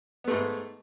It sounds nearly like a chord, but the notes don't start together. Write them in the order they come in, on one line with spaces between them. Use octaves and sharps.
B3 A3 G#2